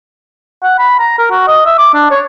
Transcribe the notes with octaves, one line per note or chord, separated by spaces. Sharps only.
F#5
B5
A#5
A#4
F#4
D#5
E5
D6
D4
C#5